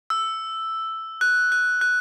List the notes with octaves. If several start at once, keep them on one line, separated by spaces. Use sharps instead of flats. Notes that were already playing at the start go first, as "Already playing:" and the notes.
E6
F#6
F#6
F#6